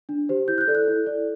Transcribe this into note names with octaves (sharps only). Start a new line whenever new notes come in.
D4
G4 C5
E4 G6
F#6
G6
A4 D5
F#6
E4
A4 D5